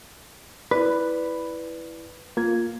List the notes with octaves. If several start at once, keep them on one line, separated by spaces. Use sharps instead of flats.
E4 B4 D5
A#3 F4 G#6